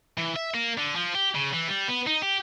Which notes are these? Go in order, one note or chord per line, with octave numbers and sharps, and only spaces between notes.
E3
E5
A#3
D3
F3
G4
C#3
E3
G3
B3
D#4
G4